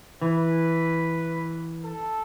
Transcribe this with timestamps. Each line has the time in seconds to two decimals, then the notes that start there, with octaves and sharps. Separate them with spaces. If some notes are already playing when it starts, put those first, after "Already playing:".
0.22 E3 B4
1.84 A4